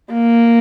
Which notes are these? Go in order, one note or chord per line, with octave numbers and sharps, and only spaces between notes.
A#3